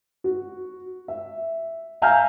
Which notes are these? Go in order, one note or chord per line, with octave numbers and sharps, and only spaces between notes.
F#4
E5
E5 F5 G#5 A#5 F6 G6